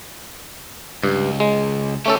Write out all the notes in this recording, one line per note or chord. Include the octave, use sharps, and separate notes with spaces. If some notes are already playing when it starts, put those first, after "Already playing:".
C#2 G2
G#3
D#3 A3 C#4 G4 A4